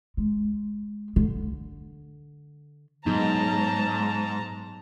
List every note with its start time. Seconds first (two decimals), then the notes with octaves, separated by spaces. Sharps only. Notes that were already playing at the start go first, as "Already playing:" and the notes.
0.17 G#3
1.16 D3
3.06 G#2 F#3 B3 D#4 A5 A#5